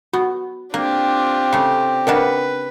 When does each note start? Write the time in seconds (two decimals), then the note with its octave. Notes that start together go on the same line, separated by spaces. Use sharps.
0.13 B3 F#4
0.74 A#3 C4 D4 F4 G4
1.53 C#3 A3
2.07 C#3 A#3 D4 A#4 B4 D#5 F#5